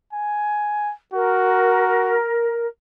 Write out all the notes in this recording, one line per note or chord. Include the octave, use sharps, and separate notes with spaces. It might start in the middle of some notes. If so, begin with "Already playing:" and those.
G#5
F#4 A#4